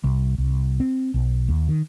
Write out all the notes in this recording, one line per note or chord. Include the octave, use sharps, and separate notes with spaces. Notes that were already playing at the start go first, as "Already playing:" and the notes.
C2
C2
C4
B1
D#2
D#3